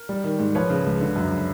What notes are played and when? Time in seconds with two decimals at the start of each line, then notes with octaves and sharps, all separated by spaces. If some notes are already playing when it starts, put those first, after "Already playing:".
Already playing: A#4
0.09 G3
0.24 D#3
0.39 G#2
0.55 F3 B4 C#5
0.70 C#3
0.86 C#2
1.01 D3
1.16 F#2